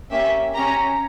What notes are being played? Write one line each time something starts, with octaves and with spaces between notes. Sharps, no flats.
A#3 C#4 G4 E5
C#4 G4 A#5